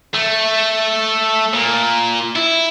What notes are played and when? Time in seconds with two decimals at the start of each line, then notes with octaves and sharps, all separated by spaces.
0.14 A3
1.54 A#2
2.36 E4